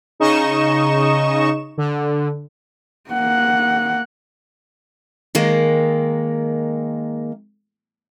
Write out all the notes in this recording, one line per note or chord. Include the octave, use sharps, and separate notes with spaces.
C#3 D#4 D#5 C#6 E7
D3
A#3 F#5
D#3 G#3 A#3